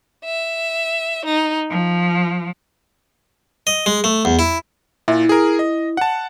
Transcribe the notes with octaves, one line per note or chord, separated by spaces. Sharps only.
E5
D#4
F3
D#5
G#3
A3
E2
E4
A#2 E4
G#4 A#4
D#5
F#5 A5